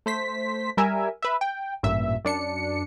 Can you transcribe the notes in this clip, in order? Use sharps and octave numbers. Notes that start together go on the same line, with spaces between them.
A3 C5 B6
G3 A#4 E5 G#5
B4 E5
G5
A1 G2 A#2 E5
F#2 D4 C#7